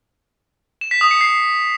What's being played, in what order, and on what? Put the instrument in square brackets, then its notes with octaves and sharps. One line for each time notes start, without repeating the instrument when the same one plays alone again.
[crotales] E7
B6
D#6
C#7
C7